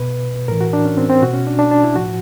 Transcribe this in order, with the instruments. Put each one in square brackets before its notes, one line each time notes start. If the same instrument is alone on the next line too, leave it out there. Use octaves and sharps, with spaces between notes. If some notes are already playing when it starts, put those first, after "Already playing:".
Already playing: [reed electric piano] B2 B4
A2 E3 A#4
F#4
D4
C#4
C4
C4
B2 F#4
C#4
D4
D4
D4
E4
A2 F3 F#4